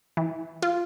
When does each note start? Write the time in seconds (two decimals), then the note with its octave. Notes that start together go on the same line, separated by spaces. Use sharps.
0.17 E3
0.62 F4